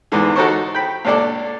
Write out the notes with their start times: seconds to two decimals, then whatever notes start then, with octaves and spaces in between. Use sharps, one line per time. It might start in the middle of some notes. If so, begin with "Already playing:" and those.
0.12 E2 G#2 D3 E3
0.35 D#4 F#4 A4 A#4 C5 C#5
0.75 G5 B5
1.05 C#2 A#2 D4 A4 D5